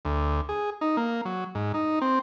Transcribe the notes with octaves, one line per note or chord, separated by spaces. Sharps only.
D2
G#4
D#4
A#3
F#3
G#2
D#4
C4